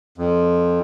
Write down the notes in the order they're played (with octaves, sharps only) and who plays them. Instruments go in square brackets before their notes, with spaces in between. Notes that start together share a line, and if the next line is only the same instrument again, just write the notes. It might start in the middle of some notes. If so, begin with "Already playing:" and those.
[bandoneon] F2